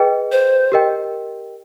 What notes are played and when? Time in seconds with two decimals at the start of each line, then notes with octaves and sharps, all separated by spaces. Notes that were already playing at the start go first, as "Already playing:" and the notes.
Already playing: G#4 B4 D#5 G5
0.32 C5
0.72 G4 A#4 D#5 G5